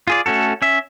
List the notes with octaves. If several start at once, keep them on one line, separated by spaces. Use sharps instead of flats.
F4 G#4 D5
A3 C#4 F#4 A4
C#4 E5